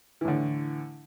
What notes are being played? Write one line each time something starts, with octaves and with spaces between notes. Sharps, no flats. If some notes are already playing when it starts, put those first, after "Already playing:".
A2 D3 E3